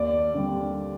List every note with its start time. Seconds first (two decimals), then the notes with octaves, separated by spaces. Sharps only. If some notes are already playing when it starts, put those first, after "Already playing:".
Already playing: D#2 D5
0.34 D3 G3 C4